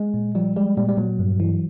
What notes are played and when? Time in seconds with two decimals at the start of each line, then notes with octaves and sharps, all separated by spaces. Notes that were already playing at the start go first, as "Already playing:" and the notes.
Already playing: G#3
0.14 A#2
0.35 F3 G3
0.56 G3 G#3
0.77 A#2 G3
0.89 G3
0.97 A#2 F#3
1.19 G2
1.40 E3